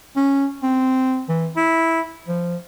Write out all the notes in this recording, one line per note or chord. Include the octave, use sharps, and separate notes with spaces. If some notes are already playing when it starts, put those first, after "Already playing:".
C#4
C4
E3
E4
F3